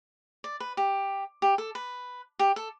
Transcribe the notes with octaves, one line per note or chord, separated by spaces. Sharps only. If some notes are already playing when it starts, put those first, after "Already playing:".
D5
B4
G4
G4
A4
B4
G4
A4